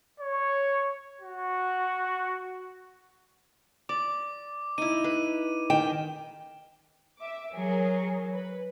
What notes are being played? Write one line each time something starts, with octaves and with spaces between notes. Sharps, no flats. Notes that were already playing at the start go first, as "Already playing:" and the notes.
C#5
F#4
D5 D6
D#4 E4 D#7
B4
D#3 G5 E7
E5 D6
F#3 G#4 A#4
B4